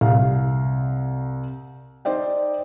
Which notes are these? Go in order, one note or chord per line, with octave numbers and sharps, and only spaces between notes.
C2 F5
D#4 C5 D5 G5